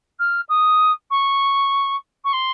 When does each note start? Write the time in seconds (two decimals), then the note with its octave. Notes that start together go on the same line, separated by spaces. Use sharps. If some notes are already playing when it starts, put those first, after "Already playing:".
0.19 F6
0.49 D#6
1.10 C#6
2.24 C#6
2.33 C6